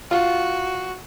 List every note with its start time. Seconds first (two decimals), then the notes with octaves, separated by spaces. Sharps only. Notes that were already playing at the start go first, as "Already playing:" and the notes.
0.11 F4 F#4